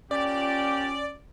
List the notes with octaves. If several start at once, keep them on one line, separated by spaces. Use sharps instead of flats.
A#2 C#4 F4 G4 D5